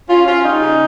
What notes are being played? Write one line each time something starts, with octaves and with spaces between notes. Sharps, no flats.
C#4 F4
C#4 F4
G3 D#4
C#3